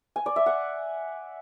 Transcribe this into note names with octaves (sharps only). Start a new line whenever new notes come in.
G#5
D5
E5
F#5